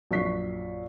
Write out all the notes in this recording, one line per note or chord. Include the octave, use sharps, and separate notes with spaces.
A#1 F#2 C#6 B6 C7